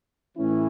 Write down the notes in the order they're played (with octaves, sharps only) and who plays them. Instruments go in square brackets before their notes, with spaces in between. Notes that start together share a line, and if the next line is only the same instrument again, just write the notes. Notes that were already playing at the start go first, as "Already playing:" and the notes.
[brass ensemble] A2 E3 C#4 E4